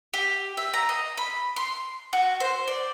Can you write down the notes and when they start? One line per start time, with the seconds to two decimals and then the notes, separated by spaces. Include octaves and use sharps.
0.14 G4
0.57 E5
0.74 A#5
0.89 D#5
1.17 B5
1.56 C6
2.13 F#4
2.40 C5
2.68 D5